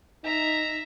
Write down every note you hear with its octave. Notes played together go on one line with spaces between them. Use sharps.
D#4 E5 A#5